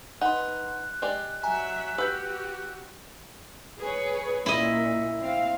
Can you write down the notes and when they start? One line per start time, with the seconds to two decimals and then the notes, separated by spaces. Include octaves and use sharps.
0.21 D#4 B4 F#5 C6 F#6
1.02 G#3 G4 D5
1.43 F#3 E5 G#5 A#5
1.98 F#4 G4 B4 B5 E6 G6
3.80 G#4 B4 C#5
4.46 A#2 E4 D#5
5.20 C4 F5